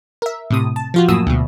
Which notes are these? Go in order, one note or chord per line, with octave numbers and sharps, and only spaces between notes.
A#4 E5
A2 C3 D#6
A5
F3 F4 F#4
F#2 A2 A#3 F#4 D#6 E6
D2 B2